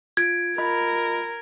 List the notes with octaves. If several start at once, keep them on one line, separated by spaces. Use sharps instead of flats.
F4 G#6 D7
F4 A#4 D#5 B5